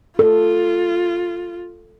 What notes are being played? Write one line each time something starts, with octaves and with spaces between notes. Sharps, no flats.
F4 A4